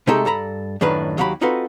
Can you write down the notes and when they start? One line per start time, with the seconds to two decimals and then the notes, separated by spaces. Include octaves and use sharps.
0.07 C3 G#3 A3 D#4 G4 A4
0.25 G2 A4 A#5 B5
0.81 F#2 A2 D#3 D4 B4
1.18 D#2 F#3 F#4 G4 B5
1.41 C4 D#4 F4 F#4 A4 B4